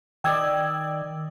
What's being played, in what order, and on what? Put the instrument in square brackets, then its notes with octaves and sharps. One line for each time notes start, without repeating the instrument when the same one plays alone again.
[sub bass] D#3 [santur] D5 D#5 [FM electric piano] G5 E6 G#6